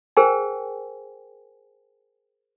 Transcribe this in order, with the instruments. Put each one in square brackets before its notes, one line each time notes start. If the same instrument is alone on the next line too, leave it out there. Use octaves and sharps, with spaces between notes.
[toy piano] G#4 A#4 C5 G5 G#5